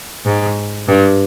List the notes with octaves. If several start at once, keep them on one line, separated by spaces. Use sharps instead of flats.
G#2
G2